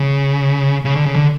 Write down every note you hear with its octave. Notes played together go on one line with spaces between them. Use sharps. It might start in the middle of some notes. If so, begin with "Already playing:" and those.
Already playing: C#3
C#3
D3
C#3
D3